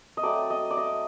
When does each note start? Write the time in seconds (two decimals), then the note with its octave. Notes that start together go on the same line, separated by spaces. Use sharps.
0.17 D#5
0.23 F#3 A3 C4 D5
0.50 D#5
0.71 D5
0.77 D#5